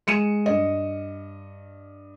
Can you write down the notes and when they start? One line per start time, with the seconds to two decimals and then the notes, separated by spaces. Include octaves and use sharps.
0.07 G#3 C#7 D#7 E7
0.46 G2 D#5